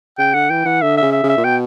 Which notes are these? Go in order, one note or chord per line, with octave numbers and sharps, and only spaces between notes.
C#3 G5
D3 F#5
E3 G5
E3 F#5
D3 E5
E5
C#3
E5
C#3
E5
A#2
B2 G5